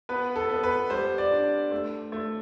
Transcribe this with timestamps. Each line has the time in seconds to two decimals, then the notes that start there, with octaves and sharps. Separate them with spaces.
0.09 B3 B4
0.36 A4
0.50 B3
0.63 B4
0.90 G3 C5
1.18 D5
1.31 D4
1.71 A3
2.12 A3